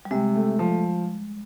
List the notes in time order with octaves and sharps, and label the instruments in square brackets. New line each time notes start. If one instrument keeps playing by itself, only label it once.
[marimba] G3
[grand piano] C3 [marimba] G#3
[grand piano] A3
F3